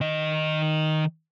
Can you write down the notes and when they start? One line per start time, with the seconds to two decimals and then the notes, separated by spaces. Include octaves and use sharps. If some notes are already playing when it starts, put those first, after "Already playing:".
0.01 D#3 D#5